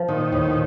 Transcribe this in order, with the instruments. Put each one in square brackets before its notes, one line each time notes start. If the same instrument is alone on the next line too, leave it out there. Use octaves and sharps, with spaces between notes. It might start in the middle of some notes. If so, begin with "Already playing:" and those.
Already playing: [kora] F3
[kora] A#2 [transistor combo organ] D#3
[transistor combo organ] D#2 [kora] A2
[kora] A#2